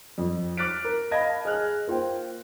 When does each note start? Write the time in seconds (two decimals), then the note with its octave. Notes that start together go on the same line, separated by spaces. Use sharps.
0.18 F2
0.57 D6 F6 F#6 A6 B6 D7
0.85 A#4
1.11 D#5 F5 A5 B5 G#6 A#6
1.45 G#4 D#5 F6 F#6
1.87 A#3 F4 C5 G5